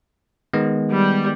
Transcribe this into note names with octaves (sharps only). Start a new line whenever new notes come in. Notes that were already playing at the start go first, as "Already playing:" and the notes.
D#3 G#3 B3
G3